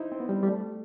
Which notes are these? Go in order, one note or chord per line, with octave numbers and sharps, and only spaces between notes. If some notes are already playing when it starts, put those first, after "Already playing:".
Already playing: D#4 E4 C5
C4
B3
G3
G3
A3